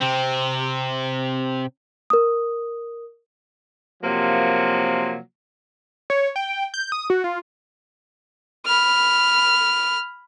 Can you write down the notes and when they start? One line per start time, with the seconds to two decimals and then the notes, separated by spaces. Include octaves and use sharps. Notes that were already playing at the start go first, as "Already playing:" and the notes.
0.01 C3 C4
2.10 A#4 D#6
4.02 C3 F3 F#3 A#3
6.10 C#5
6.36 G5
6.74 G6
6.92 D#6
7.10 F#4
7.24 F4
8.66 B5 F6